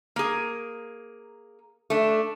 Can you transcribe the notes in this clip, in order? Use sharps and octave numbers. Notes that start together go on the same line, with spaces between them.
A#3 G#4
A3 D4